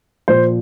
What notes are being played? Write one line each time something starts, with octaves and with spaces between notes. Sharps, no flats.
A#2 F3 C5